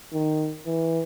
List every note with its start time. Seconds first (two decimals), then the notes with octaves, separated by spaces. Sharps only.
0.13 D#3
0.66 E3